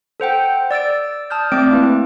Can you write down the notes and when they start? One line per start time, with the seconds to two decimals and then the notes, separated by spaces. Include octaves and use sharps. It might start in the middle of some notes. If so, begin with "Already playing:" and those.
0.20 A4 C5 F#5 G5
0.71 D5 E6 A6 D7
1.30 A5 D#6 F6 G6
1.52 A3 C4 D5 D6 D7
1.71 A#3 E4 B4